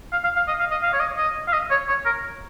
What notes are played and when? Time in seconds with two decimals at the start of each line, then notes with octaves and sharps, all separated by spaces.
0.12 F5
0.24 F5
0.36 F5
0.48 D#5
0.60 F5
0.71 D#5
0.83 F5
0.93 C#5
1.00 D#5
1.18 D#5
1.48 F5
1.53 D#5
1.70 C#5
1.88 C#5
2.06 A#4